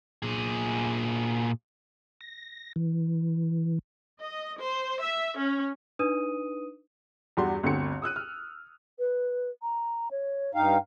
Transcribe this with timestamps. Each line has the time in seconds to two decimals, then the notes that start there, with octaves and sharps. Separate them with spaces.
0.23 A#2 G#4
2.21 A#6
2.76 E3
4.20 D#5
4.60 C5
5.01 E5
5.38 C#4
5.99 D4 D#4 B4 D#6 D#7
7.37 E2 G2 G3 F#4 F#5 C6
7.63 G1 D2 C4 C#7
8.02 D#6 E6 F#6 D#7
8.16 F6
8.99 B4
9.62 A#5
10.11 C#5
10.55 G2 D#4 F5 G5